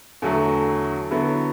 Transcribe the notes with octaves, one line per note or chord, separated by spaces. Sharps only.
E2 D3 F#3 A3
D3 F#3 B3 E4